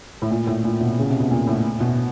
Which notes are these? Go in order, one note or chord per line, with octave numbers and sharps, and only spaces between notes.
A2
A#2
A2
A#2
B2
C#3
C3
B2
A#2
A2
B2